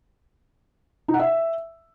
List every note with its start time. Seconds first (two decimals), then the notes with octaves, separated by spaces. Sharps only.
1.08 D#4
1.14 F#5
1.20 E5